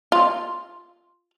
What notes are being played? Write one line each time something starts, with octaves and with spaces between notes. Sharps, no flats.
F4